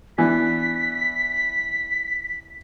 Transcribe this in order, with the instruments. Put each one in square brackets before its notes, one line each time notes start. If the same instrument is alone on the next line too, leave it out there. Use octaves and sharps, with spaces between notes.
[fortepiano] E3 B3 D4 [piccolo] B6